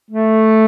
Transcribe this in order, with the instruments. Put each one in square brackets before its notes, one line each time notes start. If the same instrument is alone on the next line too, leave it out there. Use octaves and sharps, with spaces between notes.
[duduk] A3